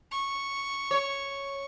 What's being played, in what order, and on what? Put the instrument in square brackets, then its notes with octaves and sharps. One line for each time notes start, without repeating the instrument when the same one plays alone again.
[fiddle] C#6
[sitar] C#5